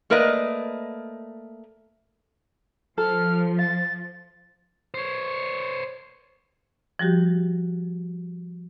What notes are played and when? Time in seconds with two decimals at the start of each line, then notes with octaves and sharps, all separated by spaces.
0.10 A3 A#3 A#4 B4 D5 D#5
2.98 F3 A4 F6
3.59 F5 A6
4.94 C5 C#5
6.99 F3 G3 F#4 G4